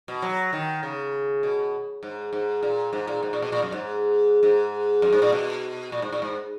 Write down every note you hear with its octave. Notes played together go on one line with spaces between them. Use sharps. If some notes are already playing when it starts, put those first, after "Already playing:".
B2
F#3
D#3
C#3
B2
G#2
G#2
A#2
G#2
A#2
G#2
A#2
B2
A#2
F#2
G#2
G#2
F#2
G#2
A#2
B2
A#2
G#2
A#2
G#2